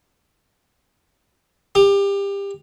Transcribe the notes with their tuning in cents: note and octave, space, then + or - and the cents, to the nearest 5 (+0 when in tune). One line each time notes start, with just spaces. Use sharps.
G4 +25